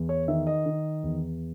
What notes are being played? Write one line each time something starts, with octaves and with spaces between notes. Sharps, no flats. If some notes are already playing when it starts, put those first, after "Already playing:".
Already playing: E2
C#5
D#3 E5
D#5
D#3
E2